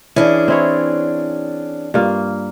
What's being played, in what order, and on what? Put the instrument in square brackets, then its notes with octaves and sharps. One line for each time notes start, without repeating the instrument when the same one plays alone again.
[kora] E3 [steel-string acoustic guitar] C#4 D4 G#4
[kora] C4 E4 C#5
G2 A#3 F4